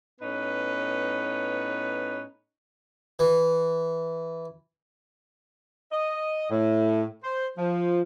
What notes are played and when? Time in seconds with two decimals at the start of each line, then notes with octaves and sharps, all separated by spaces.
0.21 A2 B3 C#4 D#4 B4
3.19 E3
5.91 D#5
6.50 A2
7.23 C5
7.57 F3